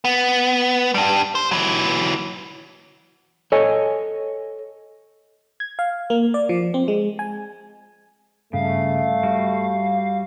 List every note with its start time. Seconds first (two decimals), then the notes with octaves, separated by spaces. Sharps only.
0.05 B3
0.94 G2 G3
1.35 C5
1.51 E3 F#3
3.52 A4 C#5 D#5 G#5
5.60 G#6
5.79 F5
6.10 A#3
6.34 D5
6.49 F3
6.74 C4
6.88 G#3
7.19 G#5
8.53 G2 C#3 A3 F5
9.23 G3 F#4